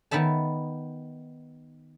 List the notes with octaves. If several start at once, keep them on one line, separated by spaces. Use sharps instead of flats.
D#3 B3 D#4 E5 A5